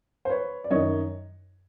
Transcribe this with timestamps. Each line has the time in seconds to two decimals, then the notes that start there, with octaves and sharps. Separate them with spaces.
0.25 C5
0.30 B4 C#5
0.64 D5
0.70 F#2 D#3 C#5 D#5